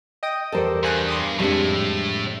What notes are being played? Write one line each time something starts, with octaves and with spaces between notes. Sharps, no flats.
D#5 G5 D#6
E2 G3 A4 A#4 C5 D5
G2 C5 G#5 F#6
C6 D6 D#6
F2 A2 G3 G#3 D4